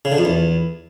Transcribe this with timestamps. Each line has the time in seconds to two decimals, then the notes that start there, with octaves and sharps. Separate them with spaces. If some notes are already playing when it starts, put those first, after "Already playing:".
0.05 C#3
0.12 D3
0.18 F2
0.25 E2